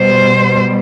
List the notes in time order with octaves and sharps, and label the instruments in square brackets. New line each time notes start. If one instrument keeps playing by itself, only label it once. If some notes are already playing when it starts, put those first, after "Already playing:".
Already playing: [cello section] B2 G3 C5